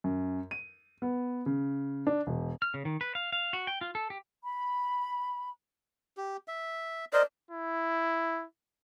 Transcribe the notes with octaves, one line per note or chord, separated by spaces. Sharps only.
F#2
D#7
B3
C#3
D4
E1
F6
C#3
D#3
B4
F5
F5
F#4
G5
F4
A4
G4
B5
G4
E5
A#4 C5 D5 D#5
E4